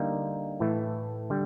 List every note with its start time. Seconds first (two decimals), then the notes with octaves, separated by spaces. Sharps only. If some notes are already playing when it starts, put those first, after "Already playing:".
Already playing: D3 G3 A#3 D#4
0.60 A2 E3 A3
1.30 D3 G3